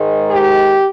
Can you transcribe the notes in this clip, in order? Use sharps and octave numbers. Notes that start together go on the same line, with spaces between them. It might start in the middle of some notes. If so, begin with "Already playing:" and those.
Already playing: G#2 D#3 G#3
G4